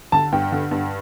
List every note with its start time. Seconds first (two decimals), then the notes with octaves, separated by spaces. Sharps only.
0.12 D3 A5
0.32 G2 G5
0.52 D3
0.71 G2